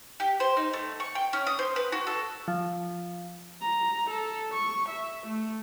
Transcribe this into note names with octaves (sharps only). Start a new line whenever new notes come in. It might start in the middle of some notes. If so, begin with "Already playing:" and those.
G4
C5
D#4
A3
C#6
G5
C#4
D#6
C5
B4
F#4
A4
F3
A#5
A4
C#6
E5
A3